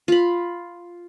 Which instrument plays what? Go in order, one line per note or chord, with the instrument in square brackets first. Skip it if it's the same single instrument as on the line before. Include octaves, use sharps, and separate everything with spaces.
[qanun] F4 B5